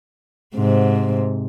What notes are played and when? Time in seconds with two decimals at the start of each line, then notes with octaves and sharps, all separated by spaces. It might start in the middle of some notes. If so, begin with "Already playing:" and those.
0.55 G#2 C3